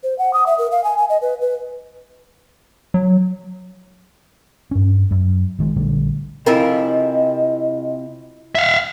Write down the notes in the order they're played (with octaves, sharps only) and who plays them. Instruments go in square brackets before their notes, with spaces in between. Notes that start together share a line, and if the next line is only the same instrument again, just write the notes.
[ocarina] C5
F#5
D#6
E5
A#4
F5
G#5
G#5
D#5
B4
B4
[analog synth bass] F#3
[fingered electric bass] G2 C#4
F#2
A1 D#3 G#3
A#1 D3 G3 A3
[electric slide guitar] C3 C4 F5 [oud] E4 F4 A#4 [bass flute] D#5
[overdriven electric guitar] E5 F5